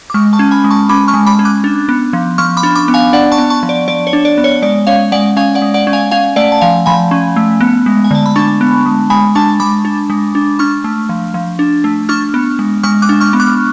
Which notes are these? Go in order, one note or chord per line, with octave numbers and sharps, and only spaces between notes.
D6
G#3 C#6 F6
A5 C#6
C#4
G#5 B5
G#3
A5 C#6
C#4 B5 D6
C#6 F6
G#3
B5 D6
C#4
D6 F#6
D4
B3
F3
F3 C#6 F6
B5 D6
D4
B5 D6
B3
F5 G#5
D4 D5 F#5
A5 C#6
B3
A5 C#6
F3
D5
F3 D5
C#5
D4
D5
B3
C#5
G#3 D5
C#4 C#5 F5
G#3 D5 F#5
C#4 F5 G#5
D5 F#5
G#3
D5 F#5
C#4
F5 G#5
C#4 F5 G#5
A3 D5 F#5
A5
F3 F5 G#5
F3 G#5 B5
C#4
A3
B3
G#3
G#5
D3 A5
B5
D4 A5 C#6
B3
G#3
G#3 G#5 B5
D4 A5 C#6
G#3 B5 D6
D4
G#3
D4
D4 C#6 F6
A3
F3
F3
D4
A3
D4 C#6 F6
B3
G#3
G#3 C#6 F6
D6 F#6
D4
C#6 F6
B3
D6 F#6